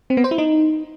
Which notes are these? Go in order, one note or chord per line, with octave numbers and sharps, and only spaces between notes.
C4
B3
C5
E4
D#4